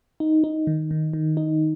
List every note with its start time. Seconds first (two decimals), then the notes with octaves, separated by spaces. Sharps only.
0.20 D#4
0.44 D#4
0.67 D#3
0.91 D#3
1.13 D#3
1.37 D#4